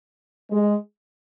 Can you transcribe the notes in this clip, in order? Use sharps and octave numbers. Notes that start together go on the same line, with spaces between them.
G#3